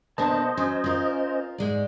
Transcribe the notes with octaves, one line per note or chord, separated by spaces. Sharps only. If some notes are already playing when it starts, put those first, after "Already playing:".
B1 B2 A#3 B3 D4 C5 D#5 A5
F#3 C#4
F4 A#4
G#2 G#3 D5